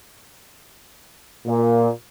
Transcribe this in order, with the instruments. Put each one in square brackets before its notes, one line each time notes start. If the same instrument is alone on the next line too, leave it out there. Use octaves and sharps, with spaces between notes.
[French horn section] A#2